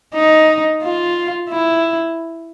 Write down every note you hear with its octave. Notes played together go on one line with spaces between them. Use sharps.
D#4
F4
E4